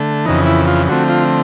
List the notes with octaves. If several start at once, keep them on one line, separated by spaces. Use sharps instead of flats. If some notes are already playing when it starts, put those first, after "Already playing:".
Already playing: D3 A3
F2 C#3 E3 D#4
E4
F4
D3 F3 A3 C4 F#4
F4